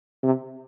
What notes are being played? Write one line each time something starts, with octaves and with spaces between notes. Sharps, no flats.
C3